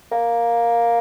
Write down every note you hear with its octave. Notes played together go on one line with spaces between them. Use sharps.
A#3